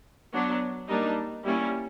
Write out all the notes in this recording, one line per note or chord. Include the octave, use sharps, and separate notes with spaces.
F#3 B3 D4
G3 A#3 D4 D#4
G3 A#3 C#4 E4